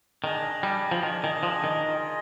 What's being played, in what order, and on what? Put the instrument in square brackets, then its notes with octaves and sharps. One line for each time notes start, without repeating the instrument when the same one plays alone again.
[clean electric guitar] D#3 [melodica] D4 G#4 D#5
[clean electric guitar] G3
F3
[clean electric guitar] D#3 [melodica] D4 G#4 D#5
[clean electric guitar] D#3
F3
D#3
[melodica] F4 G#4 D#5